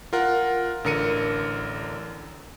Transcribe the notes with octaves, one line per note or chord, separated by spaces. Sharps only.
F4 A#4 F#5
A1 D3 A#4 C#7 D#7